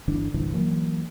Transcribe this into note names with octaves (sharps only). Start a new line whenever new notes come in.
G1 D3 E3 D4
G1 C2 D3 E3
E3 F#3 A#3